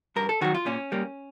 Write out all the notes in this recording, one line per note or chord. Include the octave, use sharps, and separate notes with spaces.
G2 A#4
A4
D#3 F#3 F#4
F4
A#2 C#4
G3 A#3